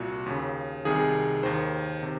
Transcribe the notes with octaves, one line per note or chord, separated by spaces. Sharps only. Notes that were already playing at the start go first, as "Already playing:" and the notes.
Already playing: C2 A#2 F#4
D#2 C#3
C2 C3 D#3 G#4
D#2 D#3 C5
C3 D#3